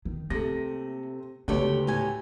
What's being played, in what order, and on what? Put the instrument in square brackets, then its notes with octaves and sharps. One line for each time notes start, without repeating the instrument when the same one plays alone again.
[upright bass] D#3
[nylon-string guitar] C3 [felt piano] A3 A#6 [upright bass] A#3
[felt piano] D2 C#5 [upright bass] C#3 G#3 [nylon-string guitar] B3 G4 A4
[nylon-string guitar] A2 G4 G#5